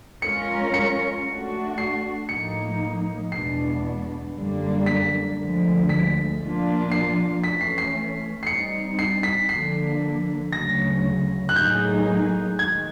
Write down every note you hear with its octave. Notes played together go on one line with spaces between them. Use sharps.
G#3 C#4 F4 A#4 C#7
C#7
A3 D4 F#4
C7
A2 F3 A#3 D#4 C#7
E2 B2 G#3 B3 D4 C7
F#2 D3 G3 A#3 D4
B6
D2 D3 F3 G#3
B6
A#2 F3 A#3 D4 F4
C7
E3 A3 C#4 B6
C7
C7
C7
G3 C4 D#4 C#7
C7
B6
D3 F3 A#3 D4 C7
D2 C#3 F#3 A#6
F#6
A2 F#3 A#3 D#4 G#4 G6
D#3 G#3 G#6